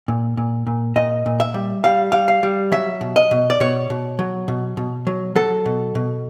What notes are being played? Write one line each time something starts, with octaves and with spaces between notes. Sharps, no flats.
A#2
A#2
A#2
A#2 D#5
A#2
E5
G3
G3 F5
G3 F5
F5
G3
F#3 E5
B2
D#5
B2
D5
B2 C#5
B2
F#3
B2
B2
F#3
F#3 A4
B2
B2